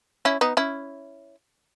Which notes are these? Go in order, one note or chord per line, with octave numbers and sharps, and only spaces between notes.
C#4 E4
B3 D#4
C#4 E4